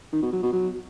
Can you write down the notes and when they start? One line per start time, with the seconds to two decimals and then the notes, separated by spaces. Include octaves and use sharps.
0.12 D#3
0.22 B2
0.32 F#3
0.42 B2
0.52 F#3